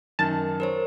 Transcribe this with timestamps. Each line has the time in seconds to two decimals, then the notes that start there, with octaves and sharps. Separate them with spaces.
0.19 F#2 D#3 A5
0.60 A#4 C5 C#5